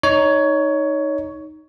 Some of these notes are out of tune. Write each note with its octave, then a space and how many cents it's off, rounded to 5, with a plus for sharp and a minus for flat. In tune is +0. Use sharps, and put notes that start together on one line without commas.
D#4 +0 C#5 +15